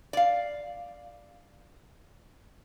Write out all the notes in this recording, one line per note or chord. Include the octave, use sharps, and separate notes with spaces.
D5 F5